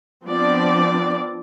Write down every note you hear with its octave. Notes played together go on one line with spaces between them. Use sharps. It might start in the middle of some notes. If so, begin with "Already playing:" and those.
F3 B3 C4 D4 F4 D5